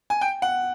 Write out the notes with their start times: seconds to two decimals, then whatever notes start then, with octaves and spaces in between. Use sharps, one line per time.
0.10 G#5
0.21 G5
0.42 F#5